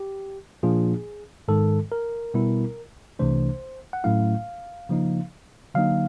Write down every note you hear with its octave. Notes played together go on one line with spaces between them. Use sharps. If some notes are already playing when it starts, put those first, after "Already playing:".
Already playing: G4
A#2 F3 A#3 D4 F4 G#4
G#2 D#3 G#3 A4
A#4
B2 G3 B3 E4
C2 C3 E3 A3 D4 C5
F#5
A2 F#3 A3 C#4 E4 F5
C#3 F3 A#3 D#4
D3 F#3 A#3 D#4 F5